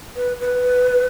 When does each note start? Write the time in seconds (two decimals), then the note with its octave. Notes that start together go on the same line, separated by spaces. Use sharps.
0.16 B4
0.41 B4